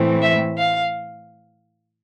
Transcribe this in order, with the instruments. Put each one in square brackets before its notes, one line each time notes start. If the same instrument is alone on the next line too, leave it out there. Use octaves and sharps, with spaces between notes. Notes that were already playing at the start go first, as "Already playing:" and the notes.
Already playing: [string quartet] A2 E3 A3 C4
E5
F5